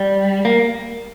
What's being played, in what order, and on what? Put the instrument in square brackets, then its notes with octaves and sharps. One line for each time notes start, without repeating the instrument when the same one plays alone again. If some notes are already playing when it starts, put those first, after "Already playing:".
Already playing: [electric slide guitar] G3
A#3